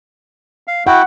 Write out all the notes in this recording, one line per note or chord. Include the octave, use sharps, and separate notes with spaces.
F5
E4 F#4 F#5 G5